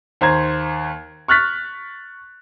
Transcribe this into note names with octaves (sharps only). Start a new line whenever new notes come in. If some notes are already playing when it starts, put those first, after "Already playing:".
D#2 C5 A#5 G#6
C#6 F6 F#6 A6 B6